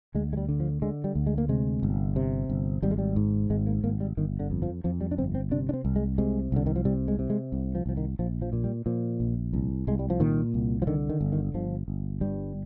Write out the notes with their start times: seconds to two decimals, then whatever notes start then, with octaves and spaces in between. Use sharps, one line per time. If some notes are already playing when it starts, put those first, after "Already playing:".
0.15 D2 G#3
0.33 G#3
0.37 G3
0.49 D3
0.60 F3
0.82 D3 G#3
1.04 G3
1.15 D2
1.27 G#3
1.38 A#3
1.49 C3 G#3
1.83 G1
2.16 C3
2.49 G1
2.82 G#1 G3
2.91 G#3
2.98 G3
3.16 G#2
3.50 G#1 G#3
3.67 A#3
3.84 G#1 A#3
4.00 G3
4.17 G1 D#3
4.39 D3
4.51 F2
4.62 F3
4.84 F2 F3
5.01 G3
5.11 D4
5.18 G1 C4
5.35 C4
5.51 C3 D4
5.69 D4
5.73 C4
5.85 C2
5.96 G#3
6.18 C3 G#3
6.52 C2 D3
6.66 D#3
6.76 F3
6.85 C3 G3
7.08 G#3
7.19 C3
7.30 G#3
7.52 C2
7.75 F3
7.86 C2 F3
7.97 D#3
8.19 A#1 F3
8.42 F3
8.53 A#2
8.64 G3
8.86 A#2 F3
9.20 A#1
9.53 C2
9.87 C2 G#3
9.99 G3
10.10 F3
10.20 A#2 D#3
10.54 C2
10.82 F3
10.87 D3 D#3
11.10 D#3
11.21 G1
11.32 D#3
11.54 G1 F3
11.88 G1
12.21 G2 G3